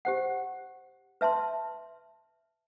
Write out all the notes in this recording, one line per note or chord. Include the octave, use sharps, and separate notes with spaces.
G4 C5 F#5
B4 E5 A5 C6